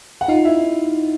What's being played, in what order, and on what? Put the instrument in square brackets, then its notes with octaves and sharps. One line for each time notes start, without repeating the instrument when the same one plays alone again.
[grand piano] F#5
[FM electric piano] D#4 [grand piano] F4 F5
[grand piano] E4 E5